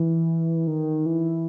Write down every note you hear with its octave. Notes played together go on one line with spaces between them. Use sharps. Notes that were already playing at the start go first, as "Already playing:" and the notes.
Already playing: E3
D#3
E3